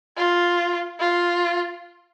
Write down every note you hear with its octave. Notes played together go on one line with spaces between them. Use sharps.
F4
F4